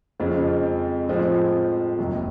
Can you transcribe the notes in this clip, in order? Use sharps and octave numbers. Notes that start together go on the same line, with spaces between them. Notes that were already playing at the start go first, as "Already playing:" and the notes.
F2 C#3 F3 G#3 C4
A2 F3 G#3 C4
F1 D#2 D#3 F#3